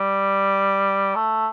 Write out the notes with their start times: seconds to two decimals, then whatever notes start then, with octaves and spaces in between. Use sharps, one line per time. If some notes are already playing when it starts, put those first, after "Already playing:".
Already playing: G3
1.15 A3